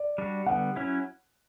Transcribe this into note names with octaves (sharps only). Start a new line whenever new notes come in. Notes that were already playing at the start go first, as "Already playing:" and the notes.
Already playing: D5
G3 D4 F#4
D3 G3 B3 F#5
F#3 C#4 E4